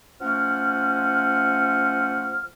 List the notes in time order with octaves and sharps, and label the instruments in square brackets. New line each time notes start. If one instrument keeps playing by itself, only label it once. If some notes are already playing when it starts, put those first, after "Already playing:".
[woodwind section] F3 A3 C#4 F#5 F6